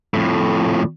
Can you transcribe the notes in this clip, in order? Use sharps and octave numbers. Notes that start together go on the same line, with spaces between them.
F2 A2